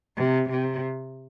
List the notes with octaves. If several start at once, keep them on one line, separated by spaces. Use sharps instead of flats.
C3
C3